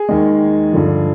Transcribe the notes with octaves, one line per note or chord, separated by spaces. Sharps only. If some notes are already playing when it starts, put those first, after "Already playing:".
Already playing: G#4
D#2 D#3 G#3
G2 D3 F3